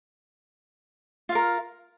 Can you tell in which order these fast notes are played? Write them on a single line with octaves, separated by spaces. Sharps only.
F4 F5 A#4